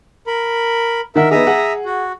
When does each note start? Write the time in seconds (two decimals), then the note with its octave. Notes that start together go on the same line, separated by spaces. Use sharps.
0.27 A#4 B5
1.16 D#3 A#4 E5 F#5
1.31 B3 D#4 G#4 E5 A#5 D#6
1.47 G#4 F#5
1.85 F#4